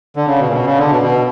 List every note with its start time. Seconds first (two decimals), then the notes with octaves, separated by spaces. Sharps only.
0.16 D3
0.27 C#3
0.39 B2
0.48 A#2
0.52 B2
0.65 C#3
0.77 D3
0.90 B2
1.03 B2